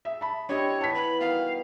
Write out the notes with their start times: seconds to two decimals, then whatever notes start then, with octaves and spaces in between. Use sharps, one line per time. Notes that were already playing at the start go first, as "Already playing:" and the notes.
0.05 G#4 E5
0.21 A5 B5
0.49 C4 D4 E4 G4 C#5 D#5
0.81 E3 B3 A5 B6
0.95 B5
1.20 B2 D#3 G3 F5